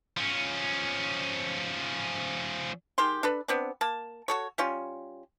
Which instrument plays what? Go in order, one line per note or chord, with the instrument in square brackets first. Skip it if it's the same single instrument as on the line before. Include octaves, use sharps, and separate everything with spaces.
[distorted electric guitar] F3 C#4
[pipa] D#3 G#3 G4 C6
D4 A4 B4
B3 C4 D4
A#3 A5
F#4 A4 C#5
G3 C#4 F4